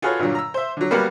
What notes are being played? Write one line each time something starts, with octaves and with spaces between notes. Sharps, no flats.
F4 F#4 G#4 A4 B4 C#5
G2 A#2 D3 F#3
A#5 E6
C5 E5
D3 F#3
G3 A#3 B3 F#4 A#4 F#5